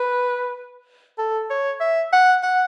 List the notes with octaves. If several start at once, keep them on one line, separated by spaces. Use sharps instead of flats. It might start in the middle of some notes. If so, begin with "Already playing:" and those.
Already playing: B4
A4
C#5
E5
F#5
F#5